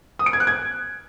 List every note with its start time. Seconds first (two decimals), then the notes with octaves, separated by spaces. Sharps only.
0.19 D#6
0.26 D7
0.33 G#6
0.40 F#6
0.47 G#6